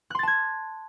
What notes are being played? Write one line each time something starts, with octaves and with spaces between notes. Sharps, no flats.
A5 C6 F#6 G#6 A6